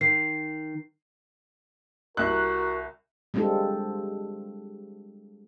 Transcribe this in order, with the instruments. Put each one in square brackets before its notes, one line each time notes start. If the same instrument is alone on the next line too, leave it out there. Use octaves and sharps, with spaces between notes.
[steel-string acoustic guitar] D#3 [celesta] C7
[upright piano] C2 F#6 [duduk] F#4 [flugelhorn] A#4
[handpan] G3 G#3 C4 D4 F4 A4